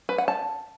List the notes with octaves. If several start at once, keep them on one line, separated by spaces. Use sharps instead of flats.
B4
F#5
A5